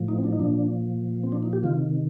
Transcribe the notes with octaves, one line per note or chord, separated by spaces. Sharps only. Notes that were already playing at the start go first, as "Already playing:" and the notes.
Already playing: A2 F3
D#4
C4
D4
D#4
A#2 F3 D4
C4
D4
D#4
G4
C3 D#3 F4